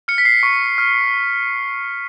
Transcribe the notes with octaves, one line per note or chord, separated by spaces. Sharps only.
F6 C#7
B6
C7
C#6
F6